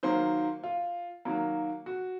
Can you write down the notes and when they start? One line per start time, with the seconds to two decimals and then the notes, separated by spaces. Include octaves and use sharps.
0.03 D#3 F#3 A#3 C5
0.64 F4
1.25 D#3 F#3 A#3 F#4
1.86 F#4